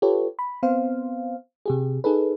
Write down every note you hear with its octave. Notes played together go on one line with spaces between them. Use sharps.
F4 G4 A4 B4 C#5
B5
B3 C4 C5 F5
C3 G4 G#4
D#4 G#4 A4 B4